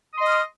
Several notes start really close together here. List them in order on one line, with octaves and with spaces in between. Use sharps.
D#6 C6 D#5 F6